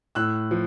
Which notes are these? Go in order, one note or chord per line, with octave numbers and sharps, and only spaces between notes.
A2 E6 F#6
F3